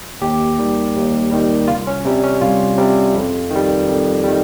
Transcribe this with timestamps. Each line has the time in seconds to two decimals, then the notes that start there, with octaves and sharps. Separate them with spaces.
0.21 D#2 G4
0.59 D#3 G3
0.96 D#2
1.31 D#3 G3
1.68 C2 F4
1.87 C#4
2.05 C3 G3
2.23 C#4
2.41 C2 F4
2.78 C3 G3
3.14 F2
3.51 D#3 G3
3.87 F2
4.24 D#3 G3